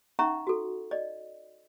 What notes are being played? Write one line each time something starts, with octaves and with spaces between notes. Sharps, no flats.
C#4 D#4 E5 F#5 A#5 C#6
F#4 A4
D5 D#5